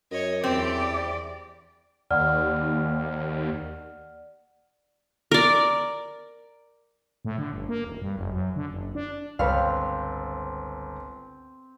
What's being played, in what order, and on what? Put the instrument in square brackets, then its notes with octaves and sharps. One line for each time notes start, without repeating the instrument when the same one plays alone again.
[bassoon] F#2 [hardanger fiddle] C#5 D#5
[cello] E2 D5 [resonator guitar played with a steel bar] C4 [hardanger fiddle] G4
[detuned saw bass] D#2 [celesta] D5 F#5 F6
[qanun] A#4 D5
[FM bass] A2
D3
G1
A#3
D#1
G2
F#1
F#2
D3
F#1
D4
[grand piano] G1 A5 [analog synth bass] C#2 [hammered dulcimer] C4 [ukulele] B4 C#5 F5